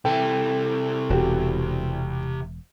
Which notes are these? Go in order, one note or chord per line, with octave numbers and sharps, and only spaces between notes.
C3 E3 A3 E4 A4 G5
E1 F#4 G4